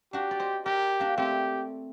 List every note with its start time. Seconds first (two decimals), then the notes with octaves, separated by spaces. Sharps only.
0.13 D4 F#4 G4
0.31 D5
0.40 C5 D#5
0.65 G4 A#4 D5
1.00 A#3 D4
1.17 A3 C4 G4